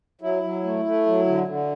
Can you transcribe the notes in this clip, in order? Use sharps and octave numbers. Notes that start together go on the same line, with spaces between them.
F#3 E4
F#3
A3
A3
F#3
D3
D3